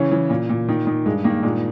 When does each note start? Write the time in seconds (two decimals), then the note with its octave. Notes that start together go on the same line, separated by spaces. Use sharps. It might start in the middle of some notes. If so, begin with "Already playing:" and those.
Already playing: C#3 E3 C#4
0.12 E3
0.30 A#2
0.49 A#2
0.69 D#3
0.87 D#3
1.05 G2 G#3
1.24 D#3 A#3
1.43 A#2 G#3